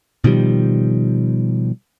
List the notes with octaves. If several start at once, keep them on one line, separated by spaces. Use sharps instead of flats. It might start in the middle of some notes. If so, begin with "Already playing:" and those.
B2 D#3 F3 G3